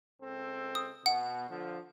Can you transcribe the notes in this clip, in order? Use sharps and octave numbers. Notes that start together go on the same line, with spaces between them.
C#2 C4 A4
D#6
B2 F#5
D3 F3